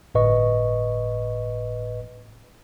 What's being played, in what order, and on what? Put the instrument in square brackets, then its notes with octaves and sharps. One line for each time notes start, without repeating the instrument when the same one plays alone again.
[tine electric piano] G1 A2 B4 D#5 C#6